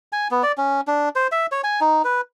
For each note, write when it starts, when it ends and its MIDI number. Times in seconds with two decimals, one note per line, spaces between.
0.13 0.28 80
0.31 0.43 59
0.43 0.52 74
0.58 0.81 61
0.87 1.09 62
1.16 1.27 72
1.32 1.46 76
1.52 1.61 73
1.64 1.80 80
1.81 2.02 63
2.04 2.21 71